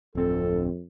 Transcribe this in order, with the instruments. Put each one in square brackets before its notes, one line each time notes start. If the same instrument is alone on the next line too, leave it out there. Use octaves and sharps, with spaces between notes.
[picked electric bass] D1 C4 [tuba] F2 [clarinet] A4